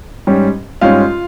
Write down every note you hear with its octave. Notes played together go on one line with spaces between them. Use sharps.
G#2 G3 C#4
G#2 G3 C#4 F4 F5